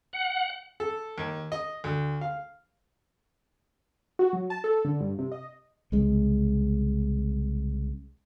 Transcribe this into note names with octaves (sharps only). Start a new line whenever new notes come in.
F#5
A4
D#2
D#5
D2
F5
F#4
F#3
A5
A4
D3
G2
C3
D#5
C2 C#3 G#3